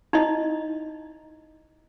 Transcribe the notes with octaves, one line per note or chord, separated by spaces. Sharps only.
D#4 E4 D#5